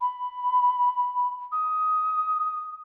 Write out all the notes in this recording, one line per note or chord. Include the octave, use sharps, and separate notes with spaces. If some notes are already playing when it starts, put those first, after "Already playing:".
B5
D#6